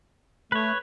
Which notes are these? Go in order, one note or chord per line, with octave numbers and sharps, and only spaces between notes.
A3 B4 C#5